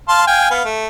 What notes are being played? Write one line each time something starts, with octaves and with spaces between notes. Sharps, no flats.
F5 A5 C6
F5 G5 G#5
B3 F5
A3